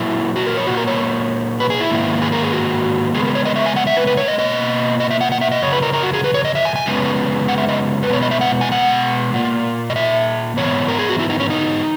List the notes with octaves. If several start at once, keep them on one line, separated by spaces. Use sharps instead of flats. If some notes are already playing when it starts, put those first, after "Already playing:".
Already playing: A#2 F#3 A#3 E4
F#4
A#4
C#5
A#2 F#3 A#3 F#4
A#4
C#5
B4
G#4
E4
G#2 D#3 A#3
G#4
A#4
G#4
F#4
C#3 G#3 B3 G#4
A#4
C#5
D#5
E5
G#5
F#5
E5
B4
B4
C#5
D#5
B2 A#3 D#5
D#5
E5
F#5
F#5
E5
D#5
F#2 C#3 C#5
B4
A#4
A#4
F#4
G#4
B4
C#5
D#5
E5
G#5
G#5
F#2 C#3 G#3 B3
F#5
E5
D#5
B4
B2 G#3 B3 C#5
D#5
E5
F#5
G#5
F#5
A#2 A#3
D#5
E5
G#2 E3 B3 C#5
A#4
G#4
F#4
E4
D#4
C#4
D#4